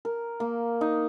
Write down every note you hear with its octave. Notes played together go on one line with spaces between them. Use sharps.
A#4
A#3
D#4